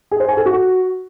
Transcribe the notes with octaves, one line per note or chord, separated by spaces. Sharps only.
G#4
C5
G#5
A4
F#4